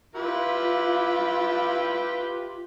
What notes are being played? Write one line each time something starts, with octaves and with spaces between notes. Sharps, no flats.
E4 F4 G4 B4